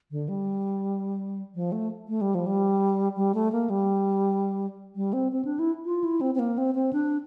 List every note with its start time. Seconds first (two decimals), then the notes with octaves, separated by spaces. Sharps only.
0.11 D3
0.28 G3
1.55 F3
1.72 A3
2.08 A3
2.21 G3
2.35 F3
2.46 G3
3.16 G3
3.35 A3
3.52 A#3
3.70 G3
4.96 G3
5.13 C4
5.32 C4
5.45 D4
5.59 E4
5.85 F4
6.04 E4
6.21 C4
6.35 C4
6.39 A#3
6.58 C4
6.75 C4
6.93 D4